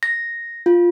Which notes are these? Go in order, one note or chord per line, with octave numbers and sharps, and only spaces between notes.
A#6
F4